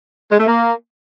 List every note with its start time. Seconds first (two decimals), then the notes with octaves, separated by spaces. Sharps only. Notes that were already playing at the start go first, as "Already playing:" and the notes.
0.32 G#3
0.39 A3
0.47 A#3